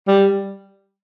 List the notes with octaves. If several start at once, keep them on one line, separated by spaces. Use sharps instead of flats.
G3